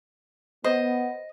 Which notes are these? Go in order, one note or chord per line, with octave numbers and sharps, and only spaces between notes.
B3 C5 D#5